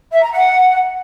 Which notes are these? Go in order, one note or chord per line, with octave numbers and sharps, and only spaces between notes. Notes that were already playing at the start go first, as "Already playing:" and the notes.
E5
A#5
F#5